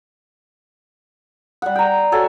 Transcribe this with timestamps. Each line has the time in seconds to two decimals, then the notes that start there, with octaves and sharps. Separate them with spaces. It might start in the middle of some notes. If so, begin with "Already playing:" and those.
1.62 G3 F#5
1.75 G5 A#5
2.12 F#4 A4 C#5 G#5